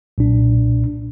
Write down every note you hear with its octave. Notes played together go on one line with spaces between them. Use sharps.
B1 A#2 D4